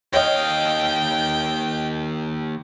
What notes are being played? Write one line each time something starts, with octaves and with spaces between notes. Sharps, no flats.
D#2 C#5 D#5 F5 G5